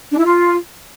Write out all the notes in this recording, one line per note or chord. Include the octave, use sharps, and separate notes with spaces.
D4
E4
F4